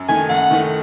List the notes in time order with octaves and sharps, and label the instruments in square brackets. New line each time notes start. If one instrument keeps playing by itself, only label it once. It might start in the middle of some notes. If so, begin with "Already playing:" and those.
Already playing: [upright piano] F#2
[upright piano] D#3 A3 [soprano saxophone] G#5
[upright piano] F#2 [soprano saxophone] F#5
[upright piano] D#3 A3